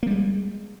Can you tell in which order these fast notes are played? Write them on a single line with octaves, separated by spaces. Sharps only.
A#3 G3 G#3